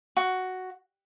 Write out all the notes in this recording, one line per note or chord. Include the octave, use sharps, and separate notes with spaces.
F#4